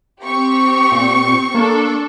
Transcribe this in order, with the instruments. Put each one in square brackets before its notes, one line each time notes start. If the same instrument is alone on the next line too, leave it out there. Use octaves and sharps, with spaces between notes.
[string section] C4 G4 [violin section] C#6
[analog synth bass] A#2
[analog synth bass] A#3 [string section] D4 A4